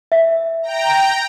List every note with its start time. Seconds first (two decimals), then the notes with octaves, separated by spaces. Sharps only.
0.12 E5
0.63 G5 A#5